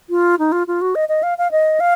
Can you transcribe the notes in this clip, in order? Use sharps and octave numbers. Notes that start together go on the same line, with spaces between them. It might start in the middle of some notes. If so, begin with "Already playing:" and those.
F4
D#4
F4
F4
F#4
D#5
D#5
F5
F5
D#5
F5